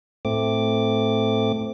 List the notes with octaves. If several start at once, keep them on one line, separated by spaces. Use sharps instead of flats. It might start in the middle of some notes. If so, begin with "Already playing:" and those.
A2 A3 C4 D6